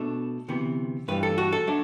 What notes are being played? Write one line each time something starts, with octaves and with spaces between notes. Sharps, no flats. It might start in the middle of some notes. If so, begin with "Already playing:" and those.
Already playing: B2 A3 D4
D2 C3 E3 B3
G2 E3 G3 B4
A4
F#4
A4
F#3 A3 D4